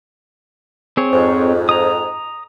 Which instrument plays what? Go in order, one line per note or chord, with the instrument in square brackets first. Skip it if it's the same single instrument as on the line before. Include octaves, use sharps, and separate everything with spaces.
[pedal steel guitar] C4 G#4 C#5
[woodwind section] F2 G#2
[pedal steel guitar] A#5 D#6